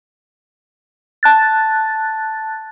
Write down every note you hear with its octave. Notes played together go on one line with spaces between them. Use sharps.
A5 F#6 A6